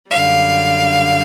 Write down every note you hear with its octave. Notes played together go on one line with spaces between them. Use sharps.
F#2 D3 G3 F5